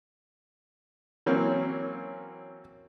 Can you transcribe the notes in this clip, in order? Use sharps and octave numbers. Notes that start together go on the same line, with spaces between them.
E3 F#3 A#3 C4 C#4